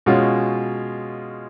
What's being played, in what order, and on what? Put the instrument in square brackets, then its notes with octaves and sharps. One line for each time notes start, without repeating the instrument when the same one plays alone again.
[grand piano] B2 G#3 C#4 F4